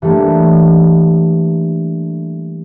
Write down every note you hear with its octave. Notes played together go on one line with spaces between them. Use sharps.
E3 G3 A3 A#3 D4